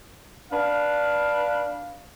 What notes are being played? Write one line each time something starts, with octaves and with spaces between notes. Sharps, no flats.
D4 B4 F5